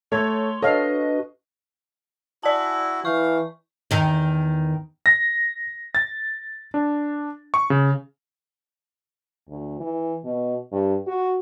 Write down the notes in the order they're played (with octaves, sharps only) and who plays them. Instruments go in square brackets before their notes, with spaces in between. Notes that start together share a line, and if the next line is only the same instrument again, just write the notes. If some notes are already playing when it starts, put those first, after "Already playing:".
[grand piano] A3 [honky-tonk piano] C#5 G#6 [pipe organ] C6
[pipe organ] D4 F#4 B4 [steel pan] A4 F5 [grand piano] C#5 [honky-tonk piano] D#5
[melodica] E4 F#4 [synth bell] D5 A5
[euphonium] E3 [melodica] F5 [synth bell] C#6
[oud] E2 D#3
[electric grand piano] A#6
A6
D4
C#6
C#3
[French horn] D2
E3
B2
G2
F#4